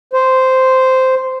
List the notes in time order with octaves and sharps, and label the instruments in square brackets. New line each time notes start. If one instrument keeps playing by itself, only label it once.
[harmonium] C5